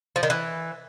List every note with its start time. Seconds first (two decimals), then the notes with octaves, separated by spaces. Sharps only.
0.16 F3
0.23 D#3
0.30 E3